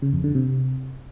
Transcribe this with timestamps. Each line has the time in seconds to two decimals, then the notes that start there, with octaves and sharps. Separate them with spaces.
0.02 C#3
0.13 F2
0.24 D3
0.35 C3